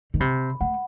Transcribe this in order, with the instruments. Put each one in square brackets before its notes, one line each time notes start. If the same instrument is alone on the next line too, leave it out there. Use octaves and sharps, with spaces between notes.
[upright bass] D#3
[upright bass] C3 [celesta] B5
[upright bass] A3 [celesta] F#5